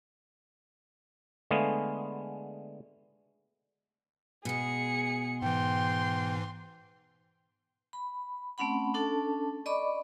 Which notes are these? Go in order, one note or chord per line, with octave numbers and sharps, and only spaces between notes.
D3 G#3 A3 B3 G#4 F5
B2 G#3 G#4 C#7
G#2 E3 G5 C6
B5
A3 C4 C#4 F#5 B5
C#4 D4 A4 A5
D5 D#5 B5 C#6 D6